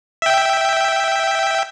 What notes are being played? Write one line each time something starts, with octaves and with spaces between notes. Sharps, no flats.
E5 G5